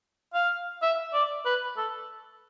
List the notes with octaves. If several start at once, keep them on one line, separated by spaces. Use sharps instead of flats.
F5
E5
D5
B4
A4